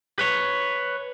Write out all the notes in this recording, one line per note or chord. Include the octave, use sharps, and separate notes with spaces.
B4 C#5